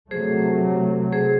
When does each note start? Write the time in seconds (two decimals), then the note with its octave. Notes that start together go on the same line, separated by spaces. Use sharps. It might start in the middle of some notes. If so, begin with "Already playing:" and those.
0.11 C3 F#3 A3 G#4 C5
1.12 G#4 C5